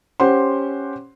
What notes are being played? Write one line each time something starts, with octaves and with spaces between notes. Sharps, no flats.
C#4 G4 C5 F#5 C6